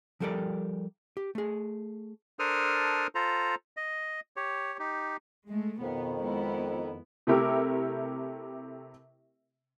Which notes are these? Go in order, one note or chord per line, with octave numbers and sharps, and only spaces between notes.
F3 G3 G4 A4 A#4 D5
G4
A3 G#4
D4 A4 A#4 C5 D#6 F6
F4 A4 C5 A#5
D#5
G4 C#5
D#4 G4
G#3 A3
F2 B2 D#3 B3
G#3 B3 E4
C3 A3 E4 G4 A#4 E6